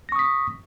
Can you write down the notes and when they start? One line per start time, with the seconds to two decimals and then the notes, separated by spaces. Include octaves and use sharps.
0.09 A#6
0.12 C#6
0.16 D#6
0.19 B6